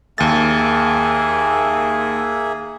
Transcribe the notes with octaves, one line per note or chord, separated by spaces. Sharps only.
D#2 A#3 G#4 E5 A6